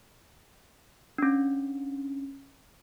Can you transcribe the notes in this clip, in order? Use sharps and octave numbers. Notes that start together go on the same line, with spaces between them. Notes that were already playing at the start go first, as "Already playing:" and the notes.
C#4 D4